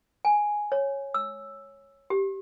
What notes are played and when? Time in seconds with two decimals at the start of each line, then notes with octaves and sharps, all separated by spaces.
0.25 G#5
0.72 C#5
1.14 E6
2.10 G4